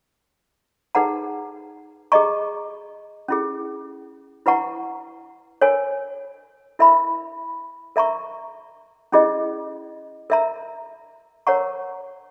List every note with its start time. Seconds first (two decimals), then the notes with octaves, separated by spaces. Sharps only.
0.95 D#4 G#4 B4 F#5 A#5
2.12 G#4 D#5 A#5 C#6
3.28 C#4 E4 G#4
4.46 E4 B4 F#5 A#5 C#6
5.61 A#4 C#5 G#5
6.79 E4 A#4 E5 B5
7.96 A#4 E5 A#5 C#6
9.12 C#4 E4 G#4 D#5
10.30 A#4 E5 A#5
11.47 A#4 C#5 F#5 A#5 C#6